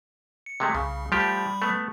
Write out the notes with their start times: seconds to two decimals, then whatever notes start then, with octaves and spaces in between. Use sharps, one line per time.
0.46 C#7
0.60 C3 G#3 A3
0.75 C2 C#3
1.12 F3 G3 A3 G4 B5
1.62 A3 B3